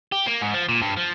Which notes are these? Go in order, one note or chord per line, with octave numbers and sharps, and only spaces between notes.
G4
A#3
G#2
F3
A#2
G2
F3